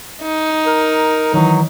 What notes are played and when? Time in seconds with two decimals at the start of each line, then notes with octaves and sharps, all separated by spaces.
0.22 D#4
0.67 A#4
1.34 D#3 E3 F#3